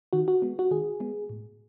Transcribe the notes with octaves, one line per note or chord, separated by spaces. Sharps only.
D#3 F#4
F#4
G#3 B3
F#4
D#3 G#4
G#3 B3
A2